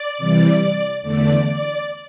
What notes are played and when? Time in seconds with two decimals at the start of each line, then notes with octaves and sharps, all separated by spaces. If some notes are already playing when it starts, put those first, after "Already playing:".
Already playing: D5
0.18 C3 E3 G3
1.02 E2 D3 A3 D5
1.44 D5